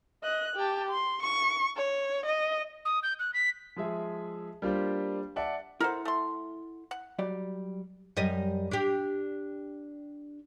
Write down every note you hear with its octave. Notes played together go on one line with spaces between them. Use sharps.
D#5 F#6
G4 A5
C6
C#6
C#5
D#5
D#6
G6
F#6
B6
F3 G#3 G#4 E5
G3 A#3 D4 F4 G4 C5
D5 E5 F#5 A5
E4 A4 A#4 C5 F#5
A3 C6
F#5
F#3 G3 D5
F#2 G3 D#5
D4 G4